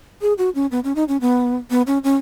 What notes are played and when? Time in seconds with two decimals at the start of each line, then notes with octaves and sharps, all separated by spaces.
0.22 G#4
0.38 F#4
0.55 C#4
0.71 B3
0.84 C#4
0.96 D#4
1.08 C#4
1.21 B3
1.70 B3
1.87 C#4
2.04 C#4